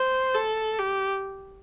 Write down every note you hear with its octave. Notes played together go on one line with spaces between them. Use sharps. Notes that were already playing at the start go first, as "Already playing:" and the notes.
Already playing: C5
A4
G4